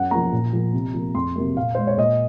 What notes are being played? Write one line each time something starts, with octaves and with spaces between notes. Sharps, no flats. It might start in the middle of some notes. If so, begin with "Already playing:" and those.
Already playing: F#2 F#5
F3 A#3 A#5
A#2
F3 A#3
C3
F3 A#3
F2 C6
C3 F#3 A#3
A#2 F5
G#3 C5
C#5
A#2 D#5